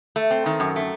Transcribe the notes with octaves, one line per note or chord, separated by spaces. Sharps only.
A3
C4
D#3
F#2
A3